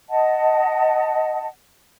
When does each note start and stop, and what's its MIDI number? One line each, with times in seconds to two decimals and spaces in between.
0.09 1.47 75
0.09 1.47 78
0.09 1.47 81